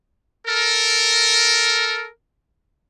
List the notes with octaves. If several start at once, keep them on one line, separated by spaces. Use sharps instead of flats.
A4 A#4